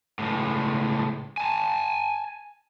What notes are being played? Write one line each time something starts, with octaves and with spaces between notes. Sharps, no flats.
C#2 A2
G#5 A5